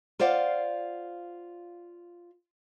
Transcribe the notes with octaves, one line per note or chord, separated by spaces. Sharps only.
F4 C5 D5 F5 F#5